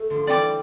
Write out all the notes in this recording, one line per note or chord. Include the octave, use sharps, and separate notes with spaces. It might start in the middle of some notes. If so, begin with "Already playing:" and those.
Already playing: A3
D3 F3
E3 G3 D5 G5 D6